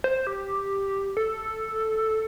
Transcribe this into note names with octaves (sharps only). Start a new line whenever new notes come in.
C5
G4
A4